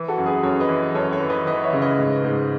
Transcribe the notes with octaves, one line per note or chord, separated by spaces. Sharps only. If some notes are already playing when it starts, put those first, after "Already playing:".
Already playing: E3
F#4 A4
F#2
G#4 B4
F#2 A4 C#5
B4 D#5
E3
F#2 A4 C#5
A4 C#5
E3
B4 D#5
E3 B4 D#5
C#5 E5
C#3
B4 D#5
G#2
G#2